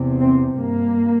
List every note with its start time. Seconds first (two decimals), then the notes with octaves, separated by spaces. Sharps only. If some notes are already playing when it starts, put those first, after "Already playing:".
Already playing: E2 C3
0.20 C4
0.57 G2 A#3